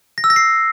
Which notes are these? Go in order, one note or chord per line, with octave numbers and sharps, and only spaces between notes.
A#6
E6
A#6
C7